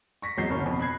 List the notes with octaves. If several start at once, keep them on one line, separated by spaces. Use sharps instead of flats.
C#6 A#6 B6
G#1 E2 F#3 D#5 G6 C7
F#1 D2 C#4 A#4 C#6
F2 B2 B5
B5 F#6 G#6 C7